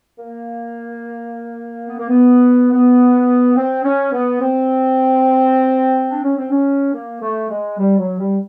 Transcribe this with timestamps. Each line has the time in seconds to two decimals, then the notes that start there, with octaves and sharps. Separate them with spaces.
0.18 A#3
1.87 B3
1.98 A#3
2.09 B3
2.71 B3
3.56 C4
3.84 C#4
4.12 B3
4.40 C4
6.09 D4
6.23 C#4
6.37 C4
6.50 C#4
6.93 A#3
7.21 A3
7.49 G#3
7.78 G3
7.98 F#3
8.19 G3